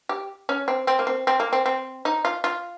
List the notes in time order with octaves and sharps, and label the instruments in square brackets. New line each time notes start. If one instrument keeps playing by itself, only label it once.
[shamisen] G4
C#4
C4
C4
A#3
C4
C4
A#3
C4
C4
D#4
F4
F4